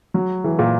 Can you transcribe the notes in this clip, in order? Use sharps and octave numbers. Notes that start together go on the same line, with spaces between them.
F#3
E3
A#2